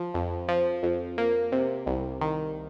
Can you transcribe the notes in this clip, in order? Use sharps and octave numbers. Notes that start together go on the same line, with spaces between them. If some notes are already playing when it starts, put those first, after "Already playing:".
Already playing: F3
F2
F3
F2
A#3
C3
C2
D#3